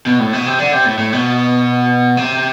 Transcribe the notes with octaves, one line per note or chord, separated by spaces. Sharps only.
B2
A2
B2
C3
D3
C3
A2
A2
B2
C3